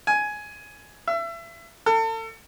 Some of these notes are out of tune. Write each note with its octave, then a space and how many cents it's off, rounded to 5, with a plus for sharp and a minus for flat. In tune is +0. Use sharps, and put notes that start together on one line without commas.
G#5 +10
E5 +30
A4 +35